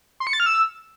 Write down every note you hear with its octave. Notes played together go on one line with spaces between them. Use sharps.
C6
C#7
A6
F6
E6